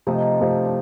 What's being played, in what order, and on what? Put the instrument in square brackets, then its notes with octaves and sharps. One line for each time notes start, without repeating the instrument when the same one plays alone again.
[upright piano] C3 F3 A3 [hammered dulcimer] D#4
[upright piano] C3 F3 A3
[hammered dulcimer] D4